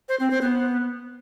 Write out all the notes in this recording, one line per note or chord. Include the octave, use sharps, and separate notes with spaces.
C5
C4
C5
B3